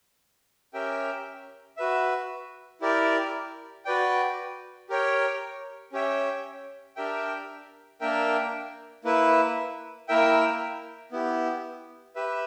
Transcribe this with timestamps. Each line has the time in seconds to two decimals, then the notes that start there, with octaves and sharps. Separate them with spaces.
0.73 C#4 G4 A#4 E5 G5
1.77 F#4 B4 E5
2.81 E4 G4 A#4 D5
3.85 F#4 B4 D5 G5
4.89 G4 A#4 C#5 G5
5.92 C#4 G4 C#5 E5 G5
6.96 D4 G4 A#4 E5 G5
8.00 A#3 D4 A#4 E5 G5
9.04 A#3 E4 B4 E5
10.08 A#3 E4 A#4 E5 G5
11.12 B3 E4 G4
12.15 G4 B4 E5